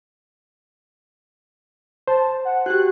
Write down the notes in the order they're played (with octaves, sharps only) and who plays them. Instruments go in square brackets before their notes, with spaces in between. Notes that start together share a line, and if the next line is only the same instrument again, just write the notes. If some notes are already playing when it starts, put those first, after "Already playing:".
[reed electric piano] C5 [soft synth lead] A5
[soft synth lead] F#5
[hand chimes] F#4 G4 [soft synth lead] F#6